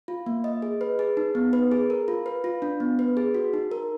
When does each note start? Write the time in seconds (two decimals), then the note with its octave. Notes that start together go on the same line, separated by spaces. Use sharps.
0.08 F4
0.26 A#3
0.44 D#5
0.62 G#4
0.81 B4
0.99 G#4
1.17 D#4
1.35 B3
1.53 B4
1.72 G#4
1.90 A#4
2.08 F4
2.26 B4
2.44 F4
2.62 D4
2.80 B3
2.99 B4
3.17 G#4
3.35 F#4
3.54 D#4
3.72 A#4